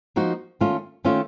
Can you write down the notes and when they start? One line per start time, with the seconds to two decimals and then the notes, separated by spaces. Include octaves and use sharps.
0.16 F3 A#3 D#4 F#4
0.61 D#3 A3 C#4 F4
1.04 D#3 A3 C#4 F4